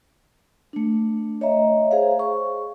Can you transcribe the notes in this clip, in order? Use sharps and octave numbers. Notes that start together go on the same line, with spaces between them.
A3 D4
C#5 D#5 E5 A#5
G#4 C5 F5
C#6